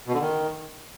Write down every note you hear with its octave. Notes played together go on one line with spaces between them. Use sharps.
B2
D3
D#3